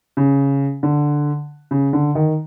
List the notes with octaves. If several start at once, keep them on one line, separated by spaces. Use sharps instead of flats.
C#3
D3
C#3
D3
D#3